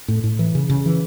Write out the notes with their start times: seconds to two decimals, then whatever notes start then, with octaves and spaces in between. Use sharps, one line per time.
0.08 A2
0.24 A2
0.39 E3
0.55 C#3
0.70 C#3
0.86 E3